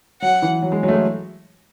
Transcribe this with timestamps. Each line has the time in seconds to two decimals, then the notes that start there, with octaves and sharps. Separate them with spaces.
0.22 F#3 F#5
0.42 E3
0.62 F#3
0.72 G#3
0.83 F#3
0.88 A3
0.93 G#3